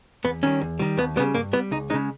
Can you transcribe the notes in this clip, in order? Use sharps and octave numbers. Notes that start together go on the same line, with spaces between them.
E2 B3
D#3 G3 C#4
E2
D#3 G3
D#2 B3
C#3 G3 B3
G2 A#3
G3 B3
C#2 D#4
C#3 G#3 D#4